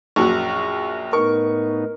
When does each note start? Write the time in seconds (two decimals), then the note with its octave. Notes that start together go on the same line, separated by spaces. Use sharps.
0.16 A#1 F#2 F#4 C#6
1.13 A2 B3 D#4 A#4 C#6